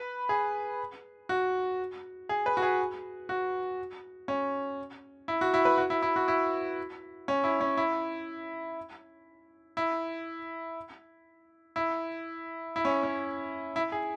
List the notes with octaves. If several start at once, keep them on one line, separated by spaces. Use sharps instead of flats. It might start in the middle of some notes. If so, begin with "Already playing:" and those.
Already playing: B4
G#4
F#4
G#4
B4
F#4
G#4
F#4
C#4
E4
F#4
E4
B4
F#4
E4
E4
F#4
E4
C#4
E4
C#4
E4
E4
E4
E4
C#4
C#4
E4
G#4